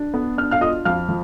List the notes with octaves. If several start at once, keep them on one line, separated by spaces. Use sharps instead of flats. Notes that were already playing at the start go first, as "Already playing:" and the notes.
Already playing: D4
B3
D4 F6
F5 F6
F4 D#5 D#6
F2 F5 F6
F3